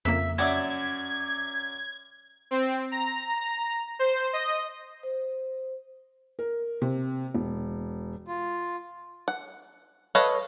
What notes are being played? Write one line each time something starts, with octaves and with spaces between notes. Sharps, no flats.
F2 C#3 A#3 E5
F#2 D5 E5 F#5 A5 D6 G#6
C4
A#5
A#5
C5
D#5
C5
A#4
C3
E1
F4
F#5
A4 B4 C#5 D#5 F5